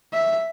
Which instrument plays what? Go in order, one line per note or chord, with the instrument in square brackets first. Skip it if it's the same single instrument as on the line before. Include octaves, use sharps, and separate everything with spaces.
[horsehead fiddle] E5